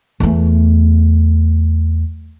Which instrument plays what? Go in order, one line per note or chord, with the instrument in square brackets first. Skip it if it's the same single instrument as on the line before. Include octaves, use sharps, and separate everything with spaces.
[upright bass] E2 A3